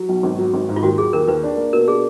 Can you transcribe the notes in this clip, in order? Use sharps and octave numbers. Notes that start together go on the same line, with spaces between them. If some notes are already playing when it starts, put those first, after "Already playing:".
Already playing: F#3
B1
G#1
F#3
G#1
G#2
F4
D#2 F#4
F#3 G#4
D#2 A#4
D#2 B4
D4
A#3
B2 A#4
D4 G#4